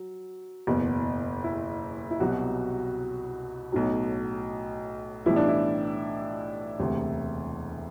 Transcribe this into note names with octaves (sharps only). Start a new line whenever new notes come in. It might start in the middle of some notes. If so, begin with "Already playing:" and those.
Already playing: F#3
F#1 E2 B2
E4
E4
C2 B2 F#3 F#4
B1 A2 F#3
B1 A2 E3 G3 E4
D4
E4
E1 D2 C3